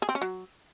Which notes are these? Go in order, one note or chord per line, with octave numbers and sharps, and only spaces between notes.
G#4
C4
C#4
F#3